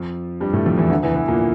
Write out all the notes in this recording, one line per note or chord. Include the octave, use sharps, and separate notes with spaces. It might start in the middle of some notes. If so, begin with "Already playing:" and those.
Already playing: F2 F3
G2 G3
A2 A3
F2 F3
E2 E3
D2 D3
E2 E3
E2 E3
A#2 A#3